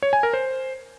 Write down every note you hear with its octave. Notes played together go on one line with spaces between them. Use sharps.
C#5
G#5
A#4
C5